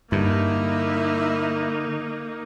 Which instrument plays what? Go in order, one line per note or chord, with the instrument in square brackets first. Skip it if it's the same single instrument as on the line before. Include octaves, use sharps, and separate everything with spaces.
[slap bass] G2 [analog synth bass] D3 [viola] A#3 D#4 [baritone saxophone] E4